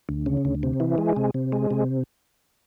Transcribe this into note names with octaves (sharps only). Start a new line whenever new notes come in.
D2
C#3
D2
C3
E3
G#3
C3
C3
G#3
C3